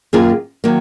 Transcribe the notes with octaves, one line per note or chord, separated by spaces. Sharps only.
F#2 D#3 A#3 F4 G#4
D#3 F#3 A#3